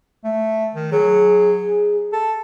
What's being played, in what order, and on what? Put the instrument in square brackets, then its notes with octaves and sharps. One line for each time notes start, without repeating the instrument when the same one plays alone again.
[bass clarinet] A3
D#3
[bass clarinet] F#3 [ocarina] G#4
[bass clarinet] A4